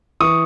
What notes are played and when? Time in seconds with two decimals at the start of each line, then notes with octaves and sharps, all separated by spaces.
0.21 E3 C#6 D#6